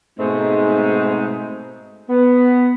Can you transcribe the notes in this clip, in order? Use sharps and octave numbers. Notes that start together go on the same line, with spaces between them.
G#2 B2 G#3 A3 C4 D#4
B3